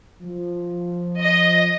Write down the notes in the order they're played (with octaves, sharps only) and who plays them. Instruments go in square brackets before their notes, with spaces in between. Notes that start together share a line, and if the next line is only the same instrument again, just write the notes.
[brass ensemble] F3
[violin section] D#5